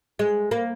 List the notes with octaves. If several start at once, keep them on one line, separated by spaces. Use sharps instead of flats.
G#3
A#3